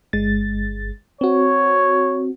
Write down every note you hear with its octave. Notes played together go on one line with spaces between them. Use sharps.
G1 G#3 A6
C4 F#4 C#5